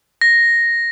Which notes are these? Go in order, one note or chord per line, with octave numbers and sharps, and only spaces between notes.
A#6